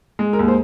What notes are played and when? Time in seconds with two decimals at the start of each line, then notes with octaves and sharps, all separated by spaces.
0.19 G#3
0.33 A#4
0.39 D#2
0.48 C5